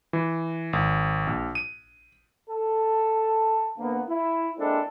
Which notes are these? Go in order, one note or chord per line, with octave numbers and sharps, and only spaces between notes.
E3
G#1
A#1
D#7
A4
D2 A#3 B3
E4
G#3 A#3 C4 D4 E4 A4